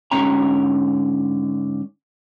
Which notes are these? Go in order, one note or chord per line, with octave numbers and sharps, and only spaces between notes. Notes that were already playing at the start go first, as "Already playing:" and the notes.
G#2 D3 C#4 G5 A#5